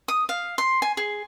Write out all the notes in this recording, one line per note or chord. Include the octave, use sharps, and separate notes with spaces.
D#6
F5
C6
G#5
G#4